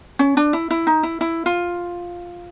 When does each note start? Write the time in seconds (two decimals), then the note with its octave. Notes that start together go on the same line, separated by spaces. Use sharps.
0.19 C#4
0.37 D4
0.53 E4
0.71 E4
0.87 D#4
1.03 E4
1.21 E4
1.46 F4